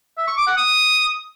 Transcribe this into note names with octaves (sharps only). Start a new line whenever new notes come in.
E5
C#6
D6
F#5
D#6